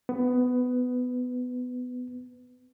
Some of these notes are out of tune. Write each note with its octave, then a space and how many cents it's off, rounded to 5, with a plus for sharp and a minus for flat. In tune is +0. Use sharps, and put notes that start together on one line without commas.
B3 +15